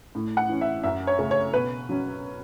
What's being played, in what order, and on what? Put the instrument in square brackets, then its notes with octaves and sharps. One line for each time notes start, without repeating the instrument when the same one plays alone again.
[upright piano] A2
F#5
E3 C#4
E5
F#2 E5
C#5
C#3 A3 C#4
C#5
B2 B4
F#3 C#4